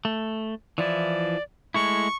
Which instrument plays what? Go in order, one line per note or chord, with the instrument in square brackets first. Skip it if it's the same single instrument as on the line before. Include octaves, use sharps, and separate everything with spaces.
[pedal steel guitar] A3
[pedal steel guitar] E3 F3 E4 [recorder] D5
[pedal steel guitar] G#3 A3 E4 [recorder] C#6